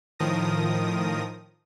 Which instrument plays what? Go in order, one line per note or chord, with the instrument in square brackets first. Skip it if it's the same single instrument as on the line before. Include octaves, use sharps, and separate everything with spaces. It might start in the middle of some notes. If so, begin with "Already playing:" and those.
[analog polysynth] A2 D#3 F3 A#4 D#6 A#6